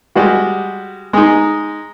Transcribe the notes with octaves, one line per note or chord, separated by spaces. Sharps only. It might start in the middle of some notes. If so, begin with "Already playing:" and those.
G3 G#3 F#4
G#3 D#4